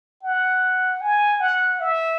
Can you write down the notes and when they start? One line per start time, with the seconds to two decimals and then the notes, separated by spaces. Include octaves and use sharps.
0.23 F#5
1.01 G#5
1.40 F#5
1.80 E5